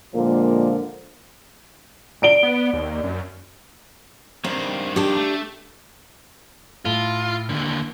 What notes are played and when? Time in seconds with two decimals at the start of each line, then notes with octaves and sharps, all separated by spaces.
0.15 A#2 D3 F3 G#3 A#3 A#4
2.22 D5 D7 G7
2.43 B3
2.73 D#2
3.04 F#2
4.44 G2 D#3 C4
4.96 D4 G4
5.17 A3
6.85 A2 F4
7.49 D#2 D3